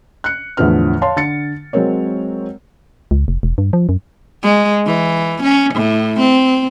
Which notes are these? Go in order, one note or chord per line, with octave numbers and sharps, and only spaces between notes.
F#6 C#7
E2 A2 D3 F3 B4 F6
C#5 F5 A5 C6
D3 A6 C#7
F#3 G#3 C4 A#4 C#5
C#2
F1
E1
G2
F3
F#2
G#3
E3
C#4
A2
C4